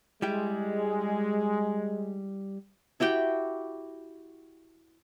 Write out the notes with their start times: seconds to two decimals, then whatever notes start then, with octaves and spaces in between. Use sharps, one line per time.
0.22 G3 G#3 E4 G5
3.00 E4 F#4 G4 G5